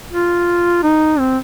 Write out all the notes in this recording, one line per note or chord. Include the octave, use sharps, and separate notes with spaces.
F4
D#4
C4